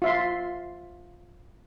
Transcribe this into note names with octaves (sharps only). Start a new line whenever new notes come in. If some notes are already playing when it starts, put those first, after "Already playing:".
F4 E5 C6